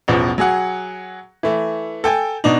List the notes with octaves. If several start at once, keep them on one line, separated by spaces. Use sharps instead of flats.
A1 E2 B2 F3
F#3 G#4 F#5
E3 A3
A4 G5 G#5
B2 D4 D#4